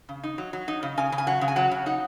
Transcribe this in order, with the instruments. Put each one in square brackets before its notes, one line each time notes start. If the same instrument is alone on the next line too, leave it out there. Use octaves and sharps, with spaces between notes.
[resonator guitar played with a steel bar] C#3
D#4
F#3
F#3
D#4
C#3
C#3 G#5
C#3
G#5
F#3 F#5
C#3
G#5
F#3 F#5
C#3
D#4 F#5